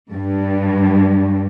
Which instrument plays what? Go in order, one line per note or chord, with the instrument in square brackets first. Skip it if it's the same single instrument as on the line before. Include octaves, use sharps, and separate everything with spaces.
[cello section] G2